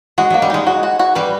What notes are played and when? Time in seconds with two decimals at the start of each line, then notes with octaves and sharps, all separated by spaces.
0.18 G#3 F#4
0.30 F#3 A#3
0.42 G3
0.50 G#3 D#4
0.67 F#4
0.83 F#4
0.99 F#4
1.15 G3 B4